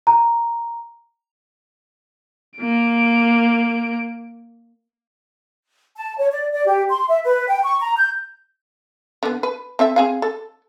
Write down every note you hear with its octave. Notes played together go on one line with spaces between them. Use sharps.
A#5
A#3 D7
A5
C#5
D5
D5
G4
C6
E5
B4
G5
C#6
A#5
G6
D3 B3
B4
C4 A4 E5
C4 G#4 F5
A4